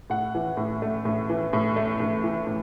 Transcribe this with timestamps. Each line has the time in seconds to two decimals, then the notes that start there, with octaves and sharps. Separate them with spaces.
0.10 A2 F#5
0.35 E3
0.57 A2
0.82 A3
1.05 A2
1.29 E3
1.53 A2
1.76 A3
2.00 A2
2.23 E3
2.47 A2